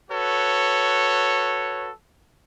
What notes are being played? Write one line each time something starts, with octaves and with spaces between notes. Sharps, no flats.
F#4 A4 B4 C#5